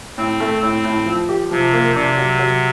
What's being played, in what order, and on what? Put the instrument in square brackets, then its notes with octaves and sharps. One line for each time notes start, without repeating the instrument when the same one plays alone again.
[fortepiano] A2 [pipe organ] C4
[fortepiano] A3
[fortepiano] A2 [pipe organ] C4
[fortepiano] A2
F3
G4
[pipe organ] C3 [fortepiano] F3
[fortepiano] A#3
[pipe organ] C3 [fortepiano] D4
[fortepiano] F#3
F#3